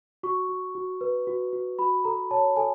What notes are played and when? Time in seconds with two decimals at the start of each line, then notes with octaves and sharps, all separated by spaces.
0.23 F#4 C#6
0.49 F#4
0.75 F#4
1.01 B4
1.27 F#4
1.53 F#4
1.79 F#4 B5
2.04 A4 A#5
2.31 C#5 A5
2.56 A4 G#5